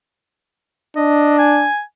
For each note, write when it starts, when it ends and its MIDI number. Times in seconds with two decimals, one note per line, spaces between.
0.97 1.69 62
0.97 1.38 75
1.39 1.81 80